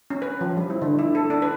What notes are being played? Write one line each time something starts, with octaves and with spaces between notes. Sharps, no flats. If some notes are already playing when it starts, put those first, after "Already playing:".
C#4
B4
F3
G3
E4
D3
E4
A4
D4
B4